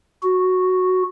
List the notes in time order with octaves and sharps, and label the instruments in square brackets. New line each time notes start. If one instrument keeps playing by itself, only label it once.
[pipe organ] F#4